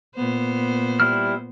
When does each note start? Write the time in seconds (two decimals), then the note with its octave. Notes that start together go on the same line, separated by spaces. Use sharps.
0.16 A#2 B3 C5
1.00 G3 E4 F6